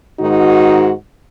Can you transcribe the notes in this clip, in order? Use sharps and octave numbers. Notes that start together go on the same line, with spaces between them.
G#2 D#3 D#4 F#4